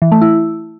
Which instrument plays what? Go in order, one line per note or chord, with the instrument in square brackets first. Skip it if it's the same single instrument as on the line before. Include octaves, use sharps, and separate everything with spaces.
[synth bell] E3
A3
E4